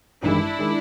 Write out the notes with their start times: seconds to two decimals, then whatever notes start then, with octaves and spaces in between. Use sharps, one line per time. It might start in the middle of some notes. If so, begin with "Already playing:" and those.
0.22 A1 G2 D#3 G#3 D4 E4
0.59 D#3 G#3